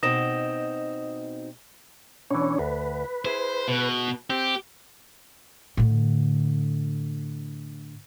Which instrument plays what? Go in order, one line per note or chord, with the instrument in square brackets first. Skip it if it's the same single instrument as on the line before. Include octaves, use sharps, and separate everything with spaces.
[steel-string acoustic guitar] B2 C4 D#4 [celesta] D#6 A#6 E7
[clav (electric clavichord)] B2 E3 [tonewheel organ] C#4 D4 C#5
[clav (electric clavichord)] D2 [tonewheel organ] B4
[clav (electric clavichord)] E4 G#4 E5 [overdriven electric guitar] C5
[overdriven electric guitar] B2
[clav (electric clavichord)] C4 [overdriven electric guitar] G4
[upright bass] A2 D3